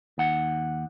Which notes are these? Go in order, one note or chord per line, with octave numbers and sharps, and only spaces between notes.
D#2 F#5